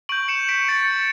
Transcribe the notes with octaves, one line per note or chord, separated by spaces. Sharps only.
C#6 G6 D7 F#7
C#7 E7
B6 D7
A6 C#7